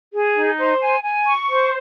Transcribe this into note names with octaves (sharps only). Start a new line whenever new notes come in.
G#4
D#4
C5
G#5
G#5
C#6
C5